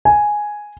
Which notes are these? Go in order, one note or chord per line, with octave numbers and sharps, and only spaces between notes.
G#5